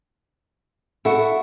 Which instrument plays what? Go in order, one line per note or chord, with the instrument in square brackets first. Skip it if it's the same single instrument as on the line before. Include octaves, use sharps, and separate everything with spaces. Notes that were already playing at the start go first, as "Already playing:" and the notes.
[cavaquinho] E4 F#4 [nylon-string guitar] A4 F#5